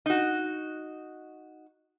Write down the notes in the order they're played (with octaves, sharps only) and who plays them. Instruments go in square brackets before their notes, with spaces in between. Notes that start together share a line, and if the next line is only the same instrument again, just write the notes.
[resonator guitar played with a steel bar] D#4 F#4